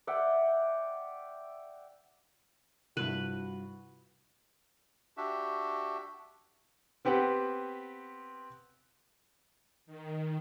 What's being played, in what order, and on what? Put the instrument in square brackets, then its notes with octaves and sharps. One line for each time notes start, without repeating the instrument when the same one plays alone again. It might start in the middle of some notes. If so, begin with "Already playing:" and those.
[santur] D5 E5 F#5 G5
[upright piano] G2 F3 [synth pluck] C3 E4 [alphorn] F#4 [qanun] B4
[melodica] D4 F#4 G4 E5
[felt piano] B3 C4 G4 B4 F#5
[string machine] D#3